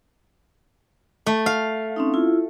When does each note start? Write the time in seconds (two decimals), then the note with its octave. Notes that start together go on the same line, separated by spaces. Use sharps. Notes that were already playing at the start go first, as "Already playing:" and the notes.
1.26 A3
1.46 F5
1.96 C4 C#4 D#4
2.14 E4 F4